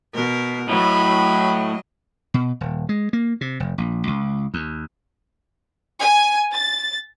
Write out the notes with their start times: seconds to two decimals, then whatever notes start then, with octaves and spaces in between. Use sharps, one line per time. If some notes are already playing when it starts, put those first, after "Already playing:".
0.14 B2 A#4
0.70 A2 F#3 D#5 B5
2.34 B2
2.61 D#1
2.89 G#3
3.13 A#3
3.41 C3
3.60 F1
3.78 A#1
4.07 C#2
4.54 D#2
6.00 G#5
6.52 A6